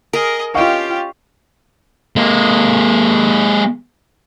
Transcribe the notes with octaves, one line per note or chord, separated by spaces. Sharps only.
G#4 A#4 D#5
C#4 F4 G4 D#5 F5 G5 C#6
G#3 A#3